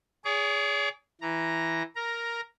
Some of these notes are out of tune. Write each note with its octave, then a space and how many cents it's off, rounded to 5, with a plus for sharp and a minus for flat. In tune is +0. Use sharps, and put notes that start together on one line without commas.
G#4 +0 C#5 +45 D6 -30
E3 +0 A#5 +0
A#4 +0 A#5 +5